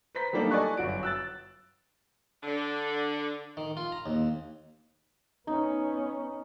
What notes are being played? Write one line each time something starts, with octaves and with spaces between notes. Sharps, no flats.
B4 C5 A#5 B6
F#3 G3 A3 A#3 D4 D#4
A4 D5 D#5 G#5 C#6 F#6
G1 F#2 F#4 D7
E6 F#6 A6
D3
D#3
F4
A#5
D#2
B3 C#4 D#4